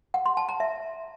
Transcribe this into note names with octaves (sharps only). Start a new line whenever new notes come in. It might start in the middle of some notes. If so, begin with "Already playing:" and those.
F#5
C6
A5
A#5
E5